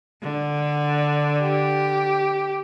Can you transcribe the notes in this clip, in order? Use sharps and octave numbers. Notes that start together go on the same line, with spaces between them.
D3
G4